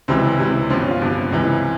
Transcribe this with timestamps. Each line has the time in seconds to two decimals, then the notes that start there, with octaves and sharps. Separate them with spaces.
0.08 C#2 C3 E3 C4
0.39 C#2 C3 E3
0.70 G1 G2 F3 C4
0.81 C#4
0.90 F4
1.01 G1 G2 F3
1.32 C#2 C3 E3